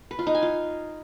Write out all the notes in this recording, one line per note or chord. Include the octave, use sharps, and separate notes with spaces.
B4
F4
D#4
G#5
F4